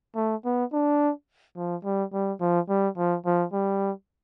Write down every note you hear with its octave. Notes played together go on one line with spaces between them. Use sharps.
A3
B3
D4
F3
G3
G3
F3
G3
F3
F3
G3